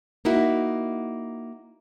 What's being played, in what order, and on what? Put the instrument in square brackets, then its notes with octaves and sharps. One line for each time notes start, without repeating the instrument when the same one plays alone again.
[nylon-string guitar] A#3 D#4 E4 F#4